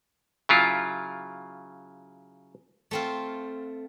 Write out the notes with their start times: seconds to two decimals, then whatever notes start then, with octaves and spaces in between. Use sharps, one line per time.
0.49 C#3 F#3 E4 F4
2.91 A3 C4 F4